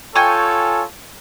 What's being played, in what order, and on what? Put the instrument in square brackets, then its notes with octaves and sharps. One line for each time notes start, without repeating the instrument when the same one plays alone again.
[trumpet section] F4 A4 C#5 [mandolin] G5 G#5 C#6